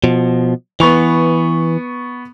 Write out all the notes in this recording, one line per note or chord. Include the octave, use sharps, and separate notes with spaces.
B2 F3
E3 B3 C#6 F7